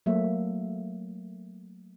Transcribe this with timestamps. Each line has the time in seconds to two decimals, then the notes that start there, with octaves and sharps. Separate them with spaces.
0.06 F#3 A3 A#3 E5